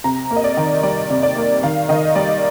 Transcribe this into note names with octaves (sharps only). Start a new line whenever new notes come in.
C3 A#5
A#3
D#5
D5
D#3
G3 D5
C3
D5
A#3
D#3 F5
D#3 D#5
G3 D5